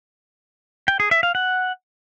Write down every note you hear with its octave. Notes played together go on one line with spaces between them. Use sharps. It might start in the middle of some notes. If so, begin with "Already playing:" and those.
G5
G#4
E5
F5
F#5